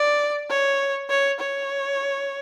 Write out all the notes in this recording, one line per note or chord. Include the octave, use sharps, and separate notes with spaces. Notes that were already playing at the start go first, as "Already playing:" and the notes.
Already playing: D5
C#5
C#5
C#5